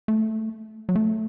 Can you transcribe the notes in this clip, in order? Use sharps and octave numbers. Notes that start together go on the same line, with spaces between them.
A3
F#3
A3